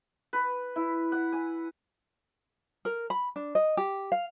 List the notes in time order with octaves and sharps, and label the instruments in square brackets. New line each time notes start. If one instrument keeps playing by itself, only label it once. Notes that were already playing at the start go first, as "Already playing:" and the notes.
[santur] B4
E4
F#5
G#5
[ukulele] A#4
B5
D4
D#5
G4
F5